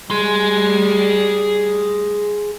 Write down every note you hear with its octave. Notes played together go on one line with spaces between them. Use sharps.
G3 G#4 C6